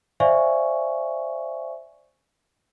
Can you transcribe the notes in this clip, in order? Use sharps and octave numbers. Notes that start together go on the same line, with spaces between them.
C5 D5 E5 F5 G#5 C#6